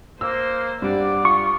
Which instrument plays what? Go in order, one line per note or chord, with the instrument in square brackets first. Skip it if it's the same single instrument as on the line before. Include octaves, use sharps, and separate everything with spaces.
[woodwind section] A#3 [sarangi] C5 [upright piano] E6
[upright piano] G2 G3 [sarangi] D5 [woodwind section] F#5 D6
[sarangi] F4 [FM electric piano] C#6